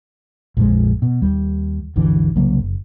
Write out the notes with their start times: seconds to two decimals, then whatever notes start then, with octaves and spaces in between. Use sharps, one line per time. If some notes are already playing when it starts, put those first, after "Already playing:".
0.57 A#1 F2 F3 G#3
1.02 B2
1.22 D#2 G3
1.96 G#1 D#2 D3 E3
2.36 C2 C#3 F#3 A#3
2.60 F#1